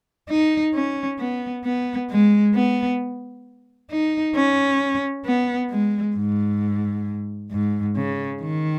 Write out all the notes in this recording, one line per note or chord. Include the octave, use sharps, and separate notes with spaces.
D#4
C#4
B3
B3
G#3
B3
D#4
C#4
B3
G#3
G#2
G#2
C#3
D#3